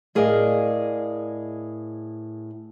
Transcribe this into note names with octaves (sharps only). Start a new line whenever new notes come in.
A2 G#4 A#4 D5 D#5 F5